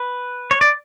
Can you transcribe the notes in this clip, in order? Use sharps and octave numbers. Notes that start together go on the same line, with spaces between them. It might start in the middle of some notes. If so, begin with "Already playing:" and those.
Already playing: B4
C#5
D5